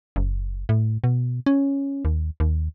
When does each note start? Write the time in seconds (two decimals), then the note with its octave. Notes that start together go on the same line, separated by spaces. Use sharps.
0.16 F#1
0.69 A2
1.04 B2
1.46 C#4
2.05 D#2
2.40 D#2